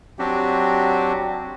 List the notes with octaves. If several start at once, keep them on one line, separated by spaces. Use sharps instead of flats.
F#3 C4 D4 F#4 G4